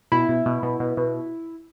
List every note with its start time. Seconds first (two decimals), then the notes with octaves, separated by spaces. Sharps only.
0.12 B2 E4
0.29 B2
0.46 B2
0.63 B2
0.80 B2
0.97 B2